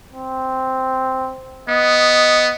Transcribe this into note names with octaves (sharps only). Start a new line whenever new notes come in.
C4
B3 D#5